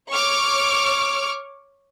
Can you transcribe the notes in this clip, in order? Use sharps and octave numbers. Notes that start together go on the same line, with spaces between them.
C#5 C#6 D6 F6